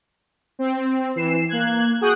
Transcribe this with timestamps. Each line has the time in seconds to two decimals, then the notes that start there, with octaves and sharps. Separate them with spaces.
0.59 C4
1.16 E3 C7 E7
1.49 A#3 F#6 G#6
2.01 F#4 G#4 G5 D#6 F#6